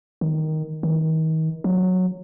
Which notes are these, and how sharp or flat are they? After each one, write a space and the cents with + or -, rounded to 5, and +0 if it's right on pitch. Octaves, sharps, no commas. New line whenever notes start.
D#3 +5
D#3 +35
F#3 -10